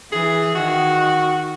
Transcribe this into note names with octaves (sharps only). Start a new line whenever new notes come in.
E3 G#4
D#3 F#4